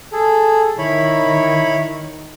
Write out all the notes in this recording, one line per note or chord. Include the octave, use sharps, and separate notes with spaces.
G#4 A4
D#3 E4 C#5 B5